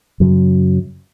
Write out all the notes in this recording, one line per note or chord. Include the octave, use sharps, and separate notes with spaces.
F#2 C#3 F#3